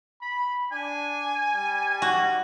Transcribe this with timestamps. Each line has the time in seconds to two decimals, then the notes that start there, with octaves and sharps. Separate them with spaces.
0.22 B5
0.72 D4 G#5
1.55 G3
2.02 F#4